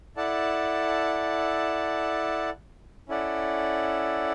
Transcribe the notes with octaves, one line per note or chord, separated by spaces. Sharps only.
E4 A4 D5 F#5 A5
C#4 E4 A4 D5 F#5